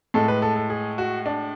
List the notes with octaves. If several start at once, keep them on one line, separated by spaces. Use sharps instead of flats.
A2 G#3 A4
B4
A4
A4
G#4
F#4
D4